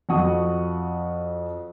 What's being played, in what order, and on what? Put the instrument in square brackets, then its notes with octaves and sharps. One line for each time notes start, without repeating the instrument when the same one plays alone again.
[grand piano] F2 F#4 F#5 C#6 D#6